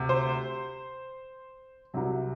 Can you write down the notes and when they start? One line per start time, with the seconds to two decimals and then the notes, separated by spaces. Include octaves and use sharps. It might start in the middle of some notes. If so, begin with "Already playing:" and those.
Already playing: D2 C3
0.09 C5
1.94 C2 C3 F#3